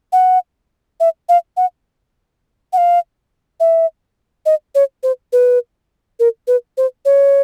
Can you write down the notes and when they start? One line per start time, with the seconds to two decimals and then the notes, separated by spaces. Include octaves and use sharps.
0.13 F#5
1.00 E5
1.29 F5
1.57 F#5
2.73 F#5
2.78 F5
3.60 E5
4.46 D#5
4.75 C#5
5.03 C5
5.33 B4
6.20 A#4
6.47 B4
6.77 C5
7.05 C#5